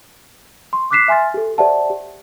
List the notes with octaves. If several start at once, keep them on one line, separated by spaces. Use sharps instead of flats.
C6 C#6
D6 F6 F#6 B6 C7 E7
E5 G#5 C6 F6 A6
G4 A4
G4 C5 D5 E5 F#5 A5
G4